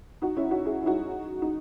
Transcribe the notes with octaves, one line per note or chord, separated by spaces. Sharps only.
D#4 F#4
C#4 E4
D#4 F#4
E4 G#4
E4
D#4 F#4
D#4